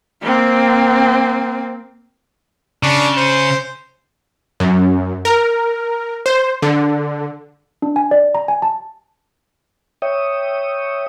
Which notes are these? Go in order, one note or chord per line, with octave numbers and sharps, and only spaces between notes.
A#3 C4
C#3 D4
C5
F#2
A#4
C5
D3
D4
G#5
D5
A#5
G#5
A5
C#5 E5 G5 D#6